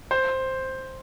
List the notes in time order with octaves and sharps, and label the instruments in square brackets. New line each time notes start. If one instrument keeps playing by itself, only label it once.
[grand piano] C5